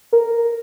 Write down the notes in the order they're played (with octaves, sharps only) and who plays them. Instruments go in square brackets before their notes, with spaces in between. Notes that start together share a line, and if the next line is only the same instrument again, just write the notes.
[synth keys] A#4